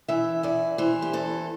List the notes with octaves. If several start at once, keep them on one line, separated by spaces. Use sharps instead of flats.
E3 E5
E2 D5
E3 C5
G4
E2 A4